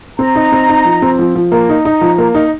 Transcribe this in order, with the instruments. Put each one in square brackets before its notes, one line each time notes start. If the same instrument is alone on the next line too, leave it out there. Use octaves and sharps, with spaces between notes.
[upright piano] C4 [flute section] A#5
[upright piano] D#4
C4
D#4
F3
C4
F3
F3
[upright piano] A#3 [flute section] A#5
[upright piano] D#4
D#4
F3
A#3
D#4